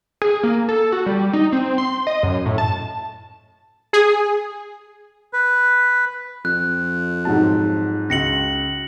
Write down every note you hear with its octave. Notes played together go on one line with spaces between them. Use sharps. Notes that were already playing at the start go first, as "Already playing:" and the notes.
G#4
A#3
A4
F#4
G3
D#4
C4
C6
D#5
F#2
A2
A5
G#4
B4
F2 F#6
G#2 F#3 A5
C#2 F#4 A#6 C#7 F#7